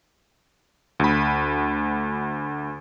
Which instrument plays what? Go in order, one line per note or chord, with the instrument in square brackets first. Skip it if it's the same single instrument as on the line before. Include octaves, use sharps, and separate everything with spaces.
[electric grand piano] D2 B5